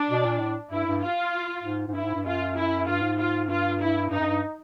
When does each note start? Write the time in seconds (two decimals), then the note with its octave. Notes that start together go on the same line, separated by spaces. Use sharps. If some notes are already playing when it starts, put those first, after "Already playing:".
Already playing: D4
0.10 B2
0.24 A#2
0.39 A2
0.71 G2 E4
0.87 G2
1.01 F4
1.63 G#2
1.88 G#2
1.94 G2 E4
2.04 G#2
2.14 G2
2.25 F#2 F4
2.56 E4
2.87 G2 F4
3.02 G#2
3.17 F4
3.49 G2 F4
3.79 E4
4.10 G2 D#4
4.20 F#2
4.25 G2